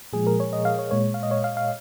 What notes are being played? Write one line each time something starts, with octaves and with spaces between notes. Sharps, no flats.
A#2 F3 G#3 G#4
A#4
C#5
D#5
F5
C#5
A#2 G#3 C#5
F5
D#5
C#5
F5
F5